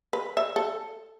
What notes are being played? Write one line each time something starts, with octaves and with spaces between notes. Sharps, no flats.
B4
E5
A4